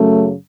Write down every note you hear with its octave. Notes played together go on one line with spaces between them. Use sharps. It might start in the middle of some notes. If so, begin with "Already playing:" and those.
Already playing: F#2 C#3 F#3 A3